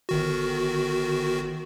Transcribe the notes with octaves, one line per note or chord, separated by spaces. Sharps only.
G1 D#3 F#4